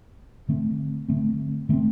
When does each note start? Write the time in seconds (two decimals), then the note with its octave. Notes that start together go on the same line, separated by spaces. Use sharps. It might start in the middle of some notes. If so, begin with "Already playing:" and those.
0.49 D3 A3 C4
1.09 D3 A3 C4
1.69 D3 A3 C4